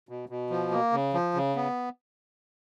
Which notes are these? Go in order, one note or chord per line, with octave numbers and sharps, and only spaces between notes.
B2
B2
F3
A#3
C#3
F3
C#3
B3